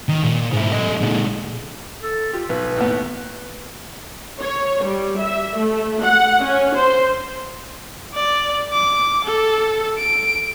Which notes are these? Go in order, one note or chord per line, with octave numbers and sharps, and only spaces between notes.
D#3
A#2
G#2 E4
A3 D#5
A#2 G#3
A4
F4 G4
B1 B4
D#2 A2 B3
C#5
G3
E5
A3
F#5
C#4
C5
D5
D6
A4
D7